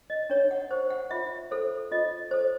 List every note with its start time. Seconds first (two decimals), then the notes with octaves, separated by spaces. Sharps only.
0.10 D#5
0.30 D4 C#5
0.51 F#5
0.71 G4 C5
0.90 F#5
1.11 F4 E5
1.51 A4 C5
1.91 F4 D#5
2.31 A4 C5